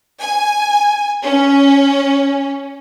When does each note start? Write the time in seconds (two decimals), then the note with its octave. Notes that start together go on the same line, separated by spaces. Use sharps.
0.21 G#5
1.23 C#4